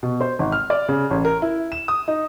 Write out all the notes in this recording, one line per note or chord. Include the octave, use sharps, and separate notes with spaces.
B2
C5
G#1
F6
D5
C#3
A1
A#4
E4
E7
D#6
D#4